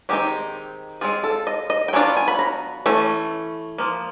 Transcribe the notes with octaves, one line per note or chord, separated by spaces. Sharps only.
D#3 G#3 C4 D#4 G4
G#3 C4 F4 G#4
A4
D#5
D#5
G5
F#3 B3 D4 F4 G#5
G#5
B5
A#5
E3 A3 C#4
F3 A#3